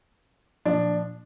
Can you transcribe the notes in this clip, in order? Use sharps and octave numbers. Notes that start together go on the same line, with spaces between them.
A#2 F3 D4